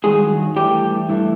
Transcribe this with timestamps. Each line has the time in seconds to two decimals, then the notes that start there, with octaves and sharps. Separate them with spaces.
0.04 G2 D#3 F#3 G#3 G#4
0.56 G2 E3 G3 A3 G4
1.09 G2 E3 A3